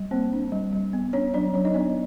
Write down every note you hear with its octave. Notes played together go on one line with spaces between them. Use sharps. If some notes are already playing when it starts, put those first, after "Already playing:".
Already playing: G3
A#3 C4 C5
D4
G3
G3
B3
C#4 D4 C#5
F#3 D4 D5
F#3 C#4 C#5
D#4 D#5
B3 D4 D5